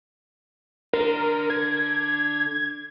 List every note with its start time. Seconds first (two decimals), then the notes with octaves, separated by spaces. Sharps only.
0.93 D3 A#4
1.50 G#6